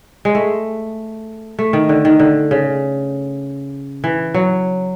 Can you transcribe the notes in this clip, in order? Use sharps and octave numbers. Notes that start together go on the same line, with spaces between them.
G#3
A3
A3
D#3
D3
D#3
D3
C#3
E3
F#3